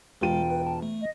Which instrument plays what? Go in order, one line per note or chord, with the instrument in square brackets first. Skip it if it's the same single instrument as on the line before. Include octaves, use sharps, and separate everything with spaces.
[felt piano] E1 F4 D#7 [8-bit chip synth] G#3 [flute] G5
[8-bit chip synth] B4
A5
A3
[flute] D#5